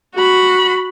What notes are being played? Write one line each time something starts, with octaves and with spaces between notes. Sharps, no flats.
F#4 B5